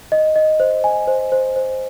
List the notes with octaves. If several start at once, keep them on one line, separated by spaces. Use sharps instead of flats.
D#5
D#5
C5
G#5
C5
C5
C5